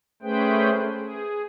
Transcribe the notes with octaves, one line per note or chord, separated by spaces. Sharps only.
A3 C#4 G#4 B4 C5 G5
G#4